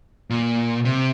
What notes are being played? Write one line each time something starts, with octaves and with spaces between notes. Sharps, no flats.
A#2
C3